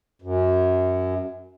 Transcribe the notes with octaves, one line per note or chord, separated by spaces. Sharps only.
F#2